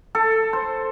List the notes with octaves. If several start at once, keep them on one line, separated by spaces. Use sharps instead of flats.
A4
C5